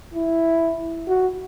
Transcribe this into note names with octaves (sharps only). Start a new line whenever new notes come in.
E4
F#4